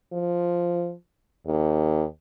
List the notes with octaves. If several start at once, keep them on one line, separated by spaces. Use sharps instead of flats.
F3
D#2